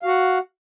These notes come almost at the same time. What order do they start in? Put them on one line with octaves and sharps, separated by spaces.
F5 F#4 F#5